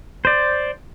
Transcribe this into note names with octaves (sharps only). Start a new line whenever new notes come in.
C5 D5